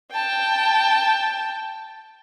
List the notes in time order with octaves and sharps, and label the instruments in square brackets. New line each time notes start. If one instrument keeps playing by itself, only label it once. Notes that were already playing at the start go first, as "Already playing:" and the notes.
[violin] G5 A5